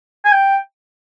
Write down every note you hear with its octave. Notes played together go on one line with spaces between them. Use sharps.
G#5
G5